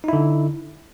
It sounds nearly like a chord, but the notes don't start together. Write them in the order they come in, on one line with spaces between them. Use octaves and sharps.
D#4 E4 D3